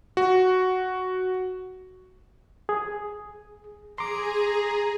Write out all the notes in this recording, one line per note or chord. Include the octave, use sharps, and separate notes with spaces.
F#4
G#4
G#4 A#5 C6 D6